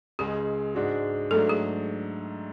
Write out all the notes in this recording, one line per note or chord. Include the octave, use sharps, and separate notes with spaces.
C#2 C#3 G#3 G#4
G#2 G#3 D4 F#4
G#2 F#3 A3 D4 A4
G#4